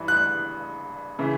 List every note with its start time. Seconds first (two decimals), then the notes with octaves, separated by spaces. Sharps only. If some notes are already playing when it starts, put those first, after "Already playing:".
Already playing: G2 E3
0.08 F#6
1.19 C#3 E3